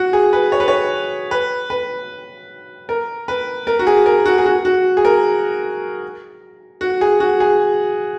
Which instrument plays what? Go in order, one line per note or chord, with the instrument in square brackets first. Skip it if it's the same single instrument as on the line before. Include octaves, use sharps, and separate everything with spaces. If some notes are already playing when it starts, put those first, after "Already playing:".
Already playing: [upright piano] F#4
G#4
B4
C#5
B4
C#5
B4
B4
A#4
B4
A#4
F#4
G#4
A#4
F#4
G#4
F#4
F#4
G#4
A#4
F#4
G#4
F#4
G#4